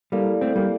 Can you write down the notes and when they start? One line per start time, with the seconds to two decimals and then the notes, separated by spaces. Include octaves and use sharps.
0.12 G3 A#3 E4 A4 D5 F5
0.41 A3 C4
0.56 G3 A#3